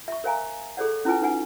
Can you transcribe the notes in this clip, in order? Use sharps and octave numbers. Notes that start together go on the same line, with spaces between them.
E5 C#6
A#4 C5 F5 G#5 A#5
G#4 A4 C5 D5 F#5
C#4 E4 F4 B4 G#5
D#4 B4 F#5 G#5